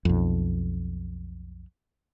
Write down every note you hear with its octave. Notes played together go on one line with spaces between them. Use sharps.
B1 F2